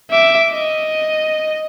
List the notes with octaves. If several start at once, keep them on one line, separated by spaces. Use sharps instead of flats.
E5 D6
D#5